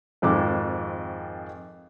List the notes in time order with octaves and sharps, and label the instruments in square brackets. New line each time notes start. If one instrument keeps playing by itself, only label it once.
[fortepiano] G#1 F2 G#2 D6